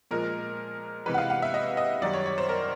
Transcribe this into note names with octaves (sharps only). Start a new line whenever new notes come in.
A#2 F3 G#3 A#4
C3 E3 G#3 B4
F#5
F5
F#5
E5
D#5
D#5
F#2 D#3 G3 D5
C#5
C#5
C5
A#4